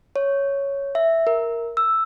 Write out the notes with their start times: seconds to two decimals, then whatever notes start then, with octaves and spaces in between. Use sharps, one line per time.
0.16 C#5
0.95 E5
1.27 A#4
1.77 E6